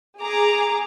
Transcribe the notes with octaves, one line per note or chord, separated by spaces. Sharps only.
G#4 A#5 D6